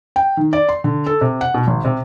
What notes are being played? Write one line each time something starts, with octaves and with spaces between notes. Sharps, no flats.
G5
D#3
D5
C6
D3
A4
C3
F#5
B2
G#1
C3